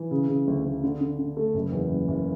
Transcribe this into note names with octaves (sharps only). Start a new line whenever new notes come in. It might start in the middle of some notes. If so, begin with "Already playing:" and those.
Already playing: E3
C#3
C#3
D2
D2
D3
D3
D3
A3
F#1
E2
F#1
F#1